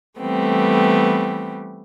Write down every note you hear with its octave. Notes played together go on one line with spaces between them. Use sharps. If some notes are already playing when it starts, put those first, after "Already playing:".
E3 G3 A3 B3 C4